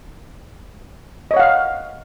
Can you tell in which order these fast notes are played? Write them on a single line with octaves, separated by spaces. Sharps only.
D#5 C#5 F#5 F5